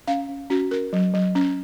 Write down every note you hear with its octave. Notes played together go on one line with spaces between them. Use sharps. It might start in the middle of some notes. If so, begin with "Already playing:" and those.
C#4 F5
C#4
C#4 F#4
C#4 A#4
F#3
F#3
C#4